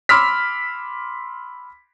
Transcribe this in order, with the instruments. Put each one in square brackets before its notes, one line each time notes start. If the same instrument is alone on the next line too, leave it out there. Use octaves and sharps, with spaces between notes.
[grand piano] B5 C6 D6 E6 F6 B6